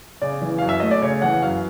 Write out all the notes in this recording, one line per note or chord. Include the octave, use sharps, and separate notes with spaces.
C#3 D5
E3
F#2 F5
E5
A3 D#5
D5
C#3 C#5
E3 F#5
F#2 F5